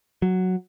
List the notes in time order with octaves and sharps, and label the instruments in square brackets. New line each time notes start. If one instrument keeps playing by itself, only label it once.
[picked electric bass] F#3